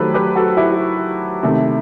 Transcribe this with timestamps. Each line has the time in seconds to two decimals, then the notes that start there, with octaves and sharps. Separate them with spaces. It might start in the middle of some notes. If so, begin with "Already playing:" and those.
Already playing: D#3 F#3 A3 G4 A4 B4 C5
0.14 G4 B4
0.35 F#4 A4
0.57 E4 G4
1.43 C3 D#3 A3